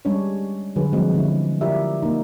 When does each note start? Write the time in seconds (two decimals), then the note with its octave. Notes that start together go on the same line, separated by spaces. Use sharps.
0.05 G3 G#3 C#4 D4 C#5
0.76 D3 F#3 G#4 B4
0.92 F3 G3 G#3 C4 F#4
1.14 D3 C#4 E4
1.61 E4 F4 G4 A#4 D5 E5
2.02 A#3 D#4